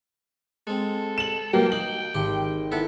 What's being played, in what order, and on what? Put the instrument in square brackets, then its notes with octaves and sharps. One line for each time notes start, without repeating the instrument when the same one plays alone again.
[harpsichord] G#3 C4 [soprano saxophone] A4
[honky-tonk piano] E7 F#7
[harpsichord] E3 [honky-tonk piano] F#3 A#3 [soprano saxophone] G5
[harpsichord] D#4 [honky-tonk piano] F#7
[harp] G#1 [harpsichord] G4
[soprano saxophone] B3 [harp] E4 [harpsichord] A4